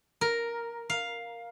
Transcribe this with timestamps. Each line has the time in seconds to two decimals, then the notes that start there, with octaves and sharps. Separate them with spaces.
0.21 A#4
0.90 F5